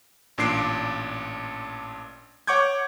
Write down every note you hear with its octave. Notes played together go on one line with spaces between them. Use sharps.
A1 A#2 D4 C7 D7
C#5 F#5 C#6 D6 G6 G#6